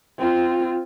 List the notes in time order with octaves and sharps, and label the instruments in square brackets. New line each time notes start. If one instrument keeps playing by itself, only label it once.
[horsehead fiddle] C4 F4